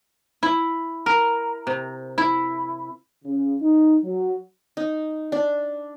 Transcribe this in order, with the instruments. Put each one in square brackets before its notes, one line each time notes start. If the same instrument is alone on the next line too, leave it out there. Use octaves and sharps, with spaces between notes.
[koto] E4
A#4
C3
E4
[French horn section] C#3
D#4
F#3
[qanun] D#4
D4